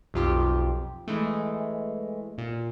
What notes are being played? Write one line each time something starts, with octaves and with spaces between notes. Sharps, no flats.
B1 F2 F4 G4
E3 G#3 A3
A#2